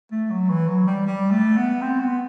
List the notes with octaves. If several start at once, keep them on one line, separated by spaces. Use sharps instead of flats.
A3
F#3
E3
F#3
G3
G3
A3
B3
C4
B3